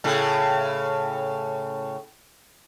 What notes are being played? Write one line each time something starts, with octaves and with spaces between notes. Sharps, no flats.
A2 C#3